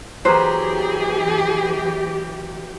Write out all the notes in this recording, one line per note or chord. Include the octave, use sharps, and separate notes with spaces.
E3 F#3 A#3 G4 G#4 B4 C5